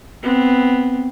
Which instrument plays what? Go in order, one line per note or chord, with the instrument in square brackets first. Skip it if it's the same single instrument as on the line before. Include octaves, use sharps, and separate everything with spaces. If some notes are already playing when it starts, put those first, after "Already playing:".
[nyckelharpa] B3 C4